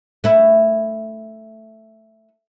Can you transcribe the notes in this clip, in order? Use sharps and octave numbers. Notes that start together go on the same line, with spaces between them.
A3 E4